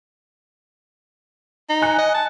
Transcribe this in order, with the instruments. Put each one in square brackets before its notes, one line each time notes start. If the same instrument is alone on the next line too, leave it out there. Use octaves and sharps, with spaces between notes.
[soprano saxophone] D#4
[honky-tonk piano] G#5 F#6 C#7
[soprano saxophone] D#5
A5